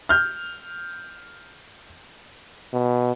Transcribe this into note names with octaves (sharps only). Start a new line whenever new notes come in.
F6 G6
B2